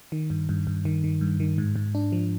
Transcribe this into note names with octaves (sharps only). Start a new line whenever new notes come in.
D#3
G2
G2
G2
D#3
D#3
G2
D#3
G#2
G#2
D4
F3